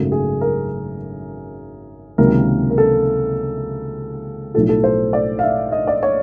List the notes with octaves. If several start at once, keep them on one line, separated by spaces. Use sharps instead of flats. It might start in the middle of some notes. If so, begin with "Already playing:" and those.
Already playing: G#1 F#2 C#3 F#3 A3
G#4
A#4
C#2 C3 D#3 F#3 A#3 A#4
A#4
A4
B1 A2 F3 A4
A4
C5
D5
F5
E5
D#5
D5
C#5